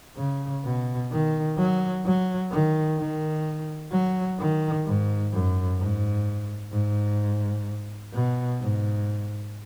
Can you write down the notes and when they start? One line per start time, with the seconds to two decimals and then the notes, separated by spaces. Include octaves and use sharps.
0.17 C#3
0.65 B2
1.12 D#3
1.58 F#3
2.05 F#3
2.51 D#3
2.98 D#3
3.92 F#3
4.39 D#3
4.86 G#2
5.33 F#2
5.79 G#2
6.73 G#2
8.14 B2
8.61 G#2